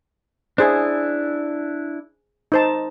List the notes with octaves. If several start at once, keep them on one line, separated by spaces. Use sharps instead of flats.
D4 E4 G#4 C5
D#4 C5 A5